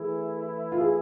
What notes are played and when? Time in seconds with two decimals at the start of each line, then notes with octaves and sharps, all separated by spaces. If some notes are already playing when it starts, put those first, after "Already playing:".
Already playing: E3 A3 E4 G#4
0.72 F4
0.80 G#4